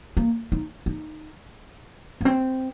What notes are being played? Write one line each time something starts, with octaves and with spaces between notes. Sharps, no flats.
A#3
D#4
D#4
A#3
C4